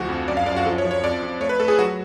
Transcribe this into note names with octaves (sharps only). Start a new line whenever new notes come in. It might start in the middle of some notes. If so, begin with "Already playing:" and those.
Already playing: D2 F3 F#4
F2
F#2 D5
F5
F#2 D5
F#4
F3 A4
C#5
F3
C#5
F2 D5
F2
A3 C#5
B4
A3 A4
G#4
F#3 F#4